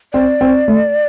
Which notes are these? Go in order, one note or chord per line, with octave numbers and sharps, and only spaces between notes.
C4 D5
C4
A3